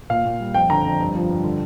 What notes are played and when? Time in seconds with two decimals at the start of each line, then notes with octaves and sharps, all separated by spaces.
0.10 A#2 F5
0.25 A#2
0.40 G3
0.54 F2 G5
0.70 D3 A#5
0.84 F2
1.00 G2
1.15 F3
1.30 G2
1.44 D3